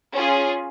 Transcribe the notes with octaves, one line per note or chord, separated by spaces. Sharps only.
C#4 F4 G#4